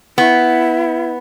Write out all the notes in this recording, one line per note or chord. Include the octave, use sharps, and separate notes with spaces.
B3 E4